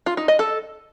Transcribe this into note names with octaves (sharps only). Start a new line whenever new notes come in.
F4
D#4
D#5
A4